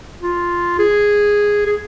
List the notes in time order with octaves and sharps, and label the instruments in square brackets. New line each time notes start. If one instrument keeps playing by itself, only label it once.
[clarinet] F4
G#4
G#4